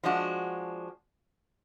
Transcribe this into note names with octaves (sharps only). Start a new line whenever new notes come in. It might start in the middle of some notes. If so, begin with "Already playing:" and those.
F3 G#3 D4 F#4